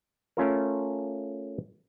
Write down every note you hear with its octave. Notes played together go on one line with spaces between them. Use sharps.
A3 C#4 F4 A#4